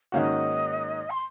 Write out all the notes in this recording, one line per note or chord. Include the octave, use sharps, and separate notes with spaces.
G#2 D#3 A#3 C#4 F#4 D#5 F5
C6